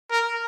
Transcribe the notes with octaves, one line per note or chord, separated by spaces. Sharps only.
A#4